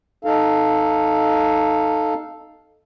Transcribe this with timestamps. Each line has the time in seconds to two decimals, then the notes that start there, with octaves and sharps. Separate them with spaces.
0.25 D#4 A4 F5